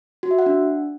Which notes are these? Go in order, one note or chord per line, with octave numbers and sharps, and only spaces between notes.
F#4
E5
F#5
D4